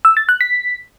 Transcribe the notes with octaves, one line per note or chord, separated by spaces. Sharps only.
E6
A6
F#6
B6